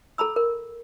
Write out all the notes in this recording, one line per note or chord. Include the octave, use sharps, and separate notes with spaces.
A4 A#5 B5 E6
A#4